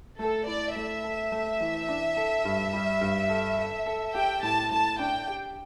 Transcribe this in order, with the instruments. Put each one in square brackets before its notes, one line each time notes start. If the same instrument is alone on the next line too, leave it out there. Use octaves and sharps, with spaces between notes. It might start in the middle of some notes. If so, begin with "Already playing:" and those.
[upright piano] A3 [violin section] A4
[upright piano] E4 [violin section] D5
[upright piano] A3 [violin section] E5
[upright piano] A4
A3
E3
D4
A4
G2
G3
G2
A4
A4
A4
[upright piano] G4 [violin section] G5
[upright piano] A2 [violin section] A5
[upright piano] A2 [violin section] A5
[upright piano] D4 [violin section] G5
[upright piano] G4